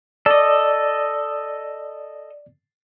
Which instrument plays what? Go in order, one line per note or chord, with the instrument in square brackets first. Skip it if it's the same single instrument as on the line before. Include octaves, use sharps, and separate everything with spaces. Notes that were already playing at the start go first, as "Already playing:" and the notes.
[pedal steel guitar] A4 D#5 [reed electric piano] D5